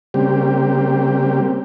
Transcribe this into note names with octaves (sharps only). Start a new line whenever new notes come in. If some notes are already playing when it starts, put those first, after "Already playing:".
C#3 G3 A#3 C4 G4